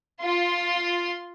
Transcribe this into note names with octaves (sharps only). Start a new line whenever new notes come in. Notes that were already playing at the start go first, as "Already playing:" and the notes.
F4 C6